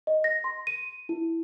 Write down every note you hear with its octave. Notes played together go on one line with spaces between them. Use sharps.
D#5
A#6
C6
D#7
E4